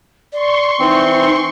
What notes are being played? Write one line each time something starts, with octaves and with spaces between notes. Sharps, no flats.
D5 C6 C#6
E3 C4 D#4